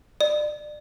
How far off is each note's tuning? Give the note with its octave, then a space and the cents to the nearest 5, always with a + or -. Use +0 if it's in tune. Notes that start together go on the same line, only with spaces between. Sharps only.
D5 +30